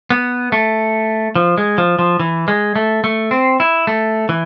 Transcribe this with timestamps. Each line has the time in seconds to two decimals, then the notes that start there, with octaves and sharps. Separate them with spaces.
0.10 B3
0.52 A3
1.36 F3
1.58 G#3
1.78 F3
1.99 F3
2.20 E3
2.48 G#3
2.76 A3
3.04 A3
3.31 C4
3.60 E4
3.87 A3
4.29 E3